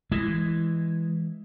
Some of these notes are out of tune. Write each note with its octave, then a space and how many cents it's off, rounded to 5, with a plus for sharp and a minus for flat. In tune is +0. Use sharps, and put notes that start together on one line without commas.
E3 +0 G#3 -5